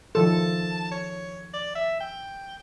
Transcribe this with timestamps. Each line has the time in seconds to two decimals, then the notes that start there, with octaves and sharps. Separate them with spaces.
0.15 D#3 F3 A4 A5
0.92 C#5
1.53 D5
1.75 E5
2.00 G5